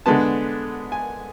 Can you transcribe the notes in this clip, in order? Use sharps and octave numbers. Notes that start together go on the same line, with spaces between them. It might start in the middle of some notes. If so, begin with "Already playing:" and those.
D3 G#3 B3 A5
G#5